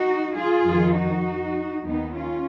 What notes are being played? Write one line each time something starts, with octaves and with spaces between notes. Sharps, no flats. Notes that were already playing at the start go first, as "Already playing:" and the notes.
Already playing: D#4 F#4
F4 G#4
F2 D#3
D#4 F#4
D#2 D#3 B3 D#4
C#4 F4